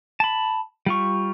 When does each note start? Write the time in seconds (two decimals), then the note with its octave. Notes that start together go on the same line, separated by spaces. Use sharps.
0.20 A5 B5
0.86 G3 F4 C#6